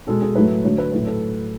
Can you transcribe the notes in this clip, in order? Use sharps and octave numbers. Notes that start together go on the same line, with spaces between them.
B2 G#3 A4
G#4
A2 F#3 A3 B4
D3 F#3 A3 C#5
B4
A2 F#3 A3 B4
A4